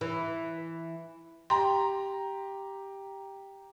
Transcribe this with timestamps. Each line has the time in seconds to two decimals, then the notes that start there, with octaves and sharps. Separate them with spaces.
0.01 E3
1.50 G4 A#5 C6